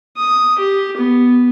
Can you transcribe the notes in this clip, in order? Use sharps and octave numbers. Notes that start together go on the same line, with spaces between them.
D#6
G4
B3